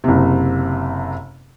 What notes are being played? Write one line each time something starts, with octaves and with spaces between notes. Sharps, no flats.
F#1 C3